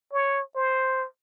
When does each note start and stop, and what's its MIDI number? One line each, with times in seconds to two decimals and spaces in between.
0.13 0.42 73
0.56 1.05 72